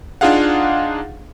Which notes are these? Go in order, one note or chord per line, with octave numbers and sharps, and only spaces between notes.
D4 D#4 F4 G#4 F5 F#5